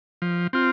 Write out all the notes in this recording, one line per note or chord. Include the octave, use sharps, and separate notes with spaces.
F3
C4 F4